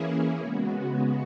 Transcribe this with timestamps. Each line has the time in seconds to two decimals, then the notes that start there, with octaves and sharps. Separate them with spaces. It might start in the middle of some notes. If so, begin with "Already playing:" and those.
Already playing: E3 A#3 C#4 E4 G#4
0.39 C#3 G#3 B3 F#4